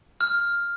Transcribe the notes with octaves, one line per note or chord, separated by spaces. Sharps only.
F6